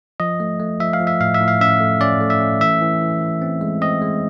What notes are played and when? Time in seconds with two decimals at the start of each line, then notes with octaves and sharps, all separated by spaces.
0.20 F3 D#5
0.40 A3
0.60 A3
0.80 F3 E5
0.93 F5
1.00 F3
1.07 E5
1.21 A2 F5
1.35 E5
1.40 A2
1.48 F5
1.61 C#4 E5
1.80 A3
2.01 C#4 D5
2.21 A3
2.30 E5
2.41 C#4
2.61 E3 E5
2.81 E3
3.01 E3
3.21 E3
3.42 C4
3.61 G#3
3.81 C4 D#5
4.02 G#3